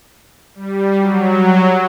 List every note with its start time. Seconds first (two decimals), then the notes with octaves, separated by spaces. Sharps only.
0.55 G3
0.99 F#3